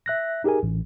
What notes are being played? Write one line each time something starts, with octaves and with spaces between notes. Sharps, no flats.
E5 F#6 A#6
D#4 G4 G#4 A#4 G#5
A1